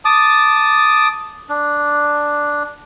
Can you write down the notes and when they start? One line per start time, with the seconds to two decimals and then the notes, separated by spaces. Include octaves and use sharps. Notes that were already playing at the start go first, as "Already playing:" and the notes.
0.05 A5 D6 D#6
1.49 D4